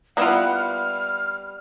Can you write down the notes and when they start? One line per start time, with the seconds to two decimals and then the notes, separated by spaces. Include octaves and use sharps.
0.17 G3 A#3 B3 E4 F4 F#5
0.54 F6